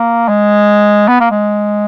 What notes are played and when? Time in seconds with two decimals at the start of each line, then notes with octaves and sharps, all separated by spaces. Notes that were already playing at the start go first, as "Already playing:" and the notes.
Already playing: A#3
0.28 G#3
1.08 B3
1.20 A#3
1.31 G#3